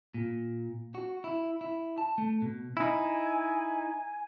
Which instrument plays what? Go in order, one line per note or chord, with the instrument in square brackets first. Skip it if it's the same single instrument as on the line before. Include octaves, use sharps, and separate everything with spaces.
[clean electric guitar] A#2
F#4
E4
E4
A5
A3
B2
[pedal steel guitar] D#4 E4 [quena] G#5